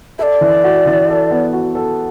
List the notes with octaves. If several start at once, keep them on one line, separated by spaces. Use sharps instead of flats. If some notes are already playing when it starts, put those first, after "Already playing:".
A4 D5 E5
E3
F#4
E3
A4
B3
F#4
A4